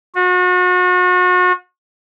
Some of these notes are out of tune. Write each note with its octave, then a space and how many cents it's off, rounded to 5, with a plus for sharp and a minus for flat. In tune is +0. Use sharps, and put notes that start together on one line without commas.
F#4 -35